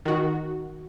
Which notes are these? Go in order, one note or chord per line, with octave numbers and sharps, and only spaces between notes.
D#3 F#4